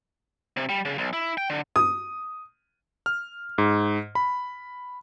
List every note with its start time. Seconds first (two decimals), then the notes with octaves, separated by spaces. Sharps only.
0.57 C3
0.69 G3
0.85 C#3
0.98 B1
1.13 E4
1.38 G5
1.50 D3
1.76 D#6
3.06 F6
3.58 G#2
4.15 B5